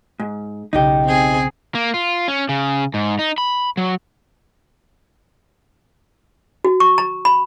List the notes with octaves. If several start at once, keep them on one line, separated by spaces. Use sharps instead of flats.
G#2
B1 C#3 D#4 G4
C4 G#4
A#3
F4
C#4
C#3
G#2
D#4
B5
F#3
F#4
C#6
A#5
B5